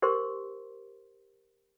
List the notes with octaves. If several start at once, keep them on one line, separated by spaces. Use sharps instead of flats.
G4 A#4 C5 C6